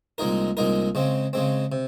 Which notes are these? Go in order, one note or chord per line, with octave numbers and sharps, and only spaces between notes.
C2 A#2 G#3 D#4 A#4
C2 A#2 G#3 D#4 A#4
C#3 G#3 C4
C#3 G#3 C4
C3